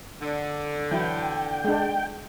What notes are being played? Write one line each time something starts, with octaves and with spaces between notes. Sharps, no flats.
D3
E3 F#3 E4 G5
G#3 D4